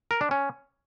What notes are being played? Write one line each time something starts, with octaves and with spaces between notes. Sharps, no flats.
A#4
D4
C#4